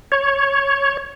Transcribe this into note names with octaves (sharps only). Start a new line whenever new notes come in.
C#5